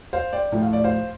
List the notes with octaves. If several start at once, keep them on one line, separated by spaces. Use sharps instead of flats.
C5 F5
D5 G5
A2 F3 A3 G5
F5
D5
C5 F5